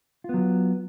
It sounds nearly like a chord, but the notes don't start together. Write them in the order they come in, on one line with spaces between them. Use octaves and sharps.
F4 B3 F#3